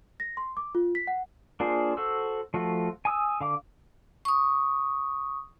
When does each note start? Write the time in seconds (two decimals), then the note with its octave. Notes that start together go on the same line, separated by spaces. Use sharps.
0.20 A#6
0.37 C6
0.57 D6
0.75 F4
0.95 B6
1.07 F#5
1.60 A#3 D4 F4 G#4 C5
1.97 F#4 A4 C5 E6
2.54 F3 A3 F4 F#4
3.05 G#5 D#6 E6
3.41 D3 F5 D6
4.25 C#6 D#6